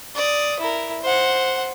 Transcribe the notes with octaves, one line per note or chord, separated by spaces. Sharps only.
D5 D#6
E4 A#4
C5 F#5